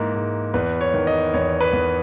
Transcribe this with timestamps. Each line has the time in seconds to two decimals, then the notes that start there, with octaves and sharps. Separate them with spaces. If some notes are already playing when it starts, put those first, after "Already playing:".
Already playing: G#2 E3 A#3
0.15 G#2
0.54 E2 B4
0.81 C#5
0.94 D#3
1.07 D#5
1.34 E2 C#5
1.61 B4
1.73 E2